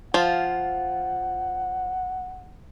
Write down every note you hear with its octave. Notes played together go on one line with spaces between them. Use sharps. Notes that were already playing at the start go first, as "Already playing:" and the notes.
F3 F4 F#5